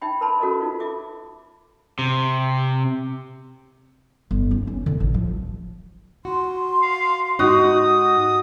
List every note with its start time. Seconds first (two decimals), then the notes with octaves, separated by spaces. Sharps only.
0.01 D#4 E5 G5 B5
0.21 A#4 B4 A5 B5 C6
0.40 C#4 F#4 A4 A#4 D#5
0.61 D#4 F4
0.80 E5 D6
1.99 C3
4.31 G1
4.51 C#4
4.67 C#4
4.86 D3
5.00 A1
5.14 F3
6.25 F#4 C6
6.82 F5
7.39 G#2 D#4 F#4 D#6